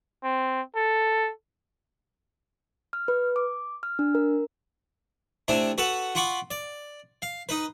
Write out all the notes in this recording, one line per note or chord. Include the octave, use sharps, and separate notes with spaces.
C4
A4
F6
B4
D6
F6
D4
A#4
C3 A3 D4 E4
F#4 A4 B4 F#5
F4 F#5 B5 C#6 D6
D5
F5
D#4 B4